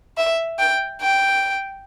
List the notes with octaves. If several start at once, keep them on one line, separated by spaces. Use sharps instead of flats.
E5
G5
G5